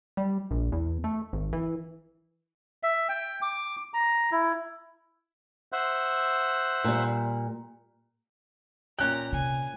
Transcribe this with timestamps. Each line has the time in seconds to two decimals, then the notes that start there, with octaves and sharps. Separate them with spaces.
0.17 G3
0.50 A#1
0.72 E2
1.04 A3
1.33 G#1
1.53 E3
2.83 E5
3.09 G5
3.42 D6
3.94 A#5
4.32 E4
5.72 C5 E5 F#5
6.84 A#2 G3
8.99 A#2 C#4 G5 A#5 F#6
9.32 C3 G#5